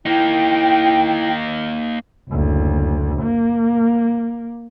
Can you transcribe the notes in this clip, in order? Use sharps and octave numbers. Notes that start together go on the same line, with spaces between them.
A#3 D#4 E4 G5
F#1 D2
A#3